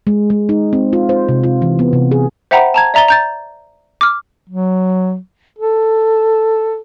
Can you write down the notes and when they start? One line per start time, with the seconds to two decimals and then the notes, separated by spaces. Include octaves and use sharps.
0.07 G#3
0.30 G#3
0.49 D#4
0.73 C4
0.93 F4
1.09 C5
1.29 C3
1.44 F4
1.62 E3
1.79 B3
1.93 C3
2.11 G#4
2.51 C5 E5 F#5 G5 A#5 B5
2.74 A5 A#5 G#6
2.94 D5 E5 A#5 A6 G7
3.08 A#5 G6 A6
4.01 D6 F6
4.50 F#3
5.59 A4